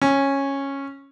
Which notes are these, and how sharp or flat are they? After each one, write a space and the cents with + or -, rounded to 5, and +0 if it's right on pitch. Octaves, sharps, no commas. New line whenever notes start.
C#4 -10